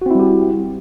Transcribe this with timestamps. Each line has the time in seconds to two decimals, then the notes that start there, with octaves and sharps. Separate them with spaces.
0.02 F#4
0.06 C4
0.11 E4
0.15 G3
0.20 G4